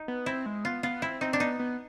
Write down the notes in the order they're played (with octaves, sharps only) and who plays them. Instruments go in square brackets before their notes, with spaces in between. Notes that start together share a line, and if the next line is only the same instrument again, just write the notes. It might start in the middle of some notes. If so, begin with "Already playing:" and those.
Already playing: [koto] D#4
[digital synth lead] B3
[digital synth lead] C4 [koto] E4
[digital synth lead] G#3
[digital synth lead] B3 [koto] F4
[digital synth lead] B3 [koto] F4
[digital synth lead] C4 [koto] E4
[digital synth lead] C4 [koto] D#4
[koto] D4
[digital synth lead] B3 [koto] D#4
[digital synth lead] B3